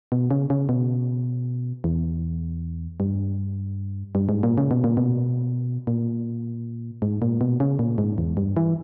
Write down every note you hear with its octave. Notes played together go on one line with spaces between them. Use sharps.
B2
C#3
C#3
B2
E2
G2
G2
G#2
A#2
C#3
B2
A#2
B2
A#2
G#2
A#2
B2
C#3
A#2
G#2
E2
G2
E3